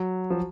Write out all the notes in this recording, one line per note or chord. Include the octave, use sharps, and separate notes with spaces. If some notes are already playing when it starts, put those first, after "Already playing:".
Already playing: F#3
F3